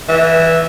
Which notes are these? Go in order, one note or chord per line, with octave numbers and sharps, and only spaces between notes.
E3